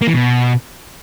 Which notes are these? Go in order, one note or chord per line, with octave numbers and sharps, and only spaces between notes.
A#3
E3
B2